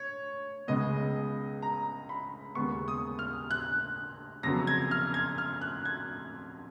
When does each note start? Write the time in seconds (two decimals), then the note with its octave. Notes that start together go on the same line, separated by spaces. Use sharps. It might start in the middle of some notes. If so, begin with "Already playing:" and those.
Already playing: C#5
0.67 C#2 C#3 G#3 B3 D#5
1.62 A#5
2.09 B5
2.55 D#2 C#3 G#3 B3 C#6
2.88 D#6
3.19 F6
3.51 F#6
4.43 F2 C#3 F#3 B3 A#6
4.67 G#6
4.91 F6
5.14 G#6
5.38 F6
5.61 F#6
5.85 G#6